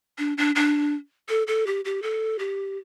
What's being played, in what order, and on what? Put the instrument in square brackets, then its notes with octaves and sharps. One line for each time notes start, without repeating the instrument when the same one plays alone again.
[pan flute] D4
D4
D4
A4
A4
G4
G4
A4
G4